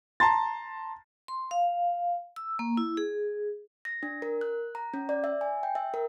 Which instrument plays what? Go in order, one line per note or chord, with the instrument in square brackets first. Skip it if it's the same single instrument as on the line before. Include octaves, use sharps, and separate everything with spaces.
[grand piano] A5 A#5 C6 A6
[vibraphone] C6
F5
E6
A#3
E4
G#4
[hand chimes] A#6
D4
A#4
F#6
A#5
C#4
D5
E5
G#5
G5
E5
A#4